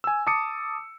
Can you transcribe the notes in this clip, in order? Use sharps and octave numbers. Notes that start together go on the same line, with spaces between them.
G#5 E6
A5 D6 D#6 C#7